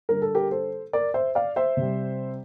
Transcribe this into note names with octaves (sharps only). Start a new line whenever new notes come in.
D3 G3 A#4
A4
G4 A#4
A4 C5
A#4 D5
C5 E5
D5 F5
C5 E5
C3 G3